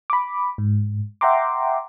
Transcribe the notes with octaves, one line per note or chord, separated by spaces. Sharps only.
B5 D6
G#2
E5 F#5 G5 A#5 C6 D6